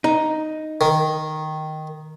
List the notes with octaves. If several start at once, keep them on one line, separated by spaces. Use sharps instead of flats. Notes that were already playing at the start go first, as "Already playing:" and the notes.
D#4
D#3